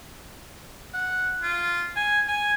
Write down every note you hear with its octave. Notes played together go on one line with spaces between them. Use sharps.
F#5
F4
G#5
G#5